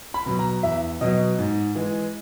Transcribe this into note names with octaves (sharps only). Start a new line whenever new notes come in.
B5
B2 F#3
A#5
E2 E5
B2 F#3 D#5
G#2
E3 G#3